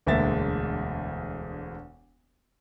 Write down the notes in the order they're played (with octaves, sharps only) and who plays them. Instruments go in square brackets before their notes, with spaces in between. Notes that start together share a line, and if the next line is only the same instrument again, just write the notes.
[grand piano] E1 D2 G#3 A#3 E5 A6